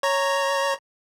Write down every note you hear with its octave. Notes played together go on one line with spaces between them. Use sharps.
C#5 A#5